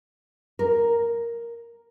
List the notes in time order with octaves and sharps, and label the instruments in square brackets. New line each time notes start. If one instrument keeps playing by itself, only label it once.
[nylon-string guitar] A#4